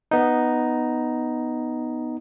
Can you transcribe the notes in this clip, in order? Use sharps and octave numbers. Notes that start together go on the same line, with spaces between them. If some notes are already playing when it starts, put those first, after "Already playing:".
B3 D#4